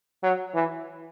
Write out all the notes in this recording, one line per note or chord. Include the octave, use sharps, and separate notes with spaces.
F#3
E3